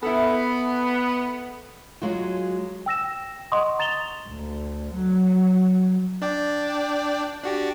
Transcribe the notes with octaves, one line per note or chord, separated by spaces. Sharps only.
B3 E4 A4
F#3 G#3 F4 F#4
G5 E6 A#6 E7
D#5 F#5 C6 C#6 D#6
A#5 A6 E7 F7 G7
D2
F#3
D4 D5 G5
D4 F#4 G4